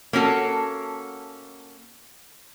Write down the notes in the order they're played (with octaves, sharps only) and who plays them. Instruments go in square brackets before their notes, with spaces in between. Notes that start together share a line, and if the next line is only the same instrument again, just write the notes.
[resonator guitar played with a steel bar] A#3 C#4 F#4 A4